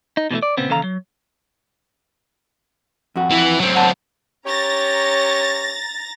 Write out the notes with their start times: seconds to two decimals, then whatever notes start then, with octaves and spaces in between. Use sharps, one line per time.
0.17 D#4
0.31 B2 E3 G3 A3
0.43 D5
0.57 A#2 C#3 B3 C4
0.69 D#2 C#3 E3 A4 F5 A#5
0.84 F#3
3.16 F2 F#4
3.30 E3 E4
3.60 F#3 C4
3.75 F#5 A5
4.46 C#4 G4 C#5 A#5 A6 A#6